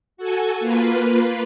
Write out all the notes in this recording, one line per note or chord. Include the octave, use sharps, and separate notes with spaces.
F#4 A4 G#5
A#3 F4 B4